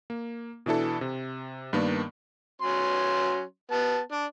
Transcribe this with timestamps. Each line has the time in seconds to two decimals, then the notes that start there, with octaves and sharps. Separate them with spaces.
0.10 A#3
0.66 B2 E3 D4 E4 A4
1.01 C3
1.73 G2 D#3 A#3 B3 D4
2.62 F#3 C#4 C6
3.71 B3 A5
4.12 D4